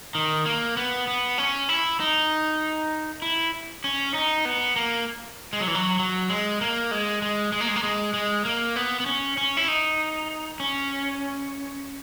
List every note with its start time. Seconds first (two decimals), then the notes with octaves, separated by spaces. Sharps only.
0.15 D#3
0.46 A#3
0.77 B3
1.07 B3
1.38 C#4
1.69 E4
2.00 D#4
3.22 E4
3.84 C#4
4.14 D#4
4.45 B3
4.76 A#3
5.53 G#3
5.60 F#3
5.68 E3
5.75 F#3
5.99 F#3
6.29 G#3
6.61 A#3
6.91 G#3
7.22 G#3
7.52 G#3
7.61 A#3
7.68 G#3
7.76 A#3
7.83 G#3
8.14 G#3
8.45 A#3
8.76 B3
9.00 B3
9.06 C#4
9.37 C#4
9.57 E4
9.68 D#4
10.60 C#4